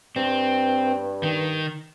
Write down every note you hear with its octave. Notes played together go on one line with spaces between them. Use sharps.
G2 C4
D#3